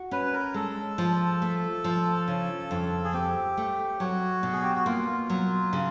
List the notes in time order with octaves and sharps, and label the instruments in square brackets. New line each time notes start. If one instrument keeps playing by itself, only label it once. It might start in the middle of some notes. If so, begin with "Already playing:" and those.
Already playing: [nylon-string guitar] F#4
[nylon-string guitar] C#4 [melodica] B4
[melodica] A#4
[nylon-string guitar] G#3 [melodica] A4
[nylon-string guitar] F3
A3
F3
C#3
F2
[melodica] G#4
[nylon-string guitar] C4 [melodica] G4
[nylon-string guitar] A3
[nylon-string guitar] F#3 [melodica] F#4
[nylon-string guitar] B2
[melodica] G#4
G4
F#4
[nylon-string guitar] A#3 [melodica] F4
[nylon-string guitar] F#3
C#3